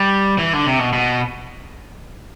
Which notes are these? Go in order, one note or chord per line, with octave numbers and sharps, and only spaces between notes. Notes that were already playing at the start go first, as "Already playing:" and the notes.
Already playing: G3
E3
D3
C3
B2
B2